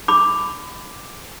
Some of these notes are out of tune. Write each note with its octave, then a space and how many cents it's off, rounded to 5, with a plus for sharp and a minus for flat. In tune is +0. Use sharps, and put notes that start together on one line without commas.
B5 +25 D6 +0